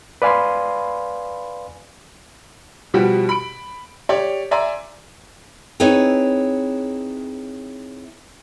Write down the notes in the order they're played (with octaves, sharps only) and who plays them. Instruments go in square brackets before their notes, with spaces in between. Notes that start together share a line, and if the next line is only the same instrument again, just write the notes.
[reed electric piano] B4 D5 F5 G#5 B5 C6
[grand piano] B2 F3 G3 F#4 G4
B5 D7
G4 C#5 D5
D5 E5 G#5 A#5 C6
[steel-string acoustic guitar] C4 D#4 E4 G#4 B4 C#5